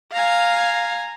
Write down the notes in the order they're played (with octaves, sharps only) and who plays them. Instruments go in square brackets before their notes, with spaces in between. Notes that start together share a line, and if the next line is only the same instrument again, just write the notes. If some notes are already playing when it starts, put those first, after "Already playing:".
[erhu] F5 [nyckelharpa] G#5 A#5